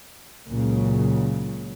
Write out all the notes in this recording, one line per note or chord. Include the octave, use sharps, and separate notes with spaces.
C#2 A#2 C#3 F#3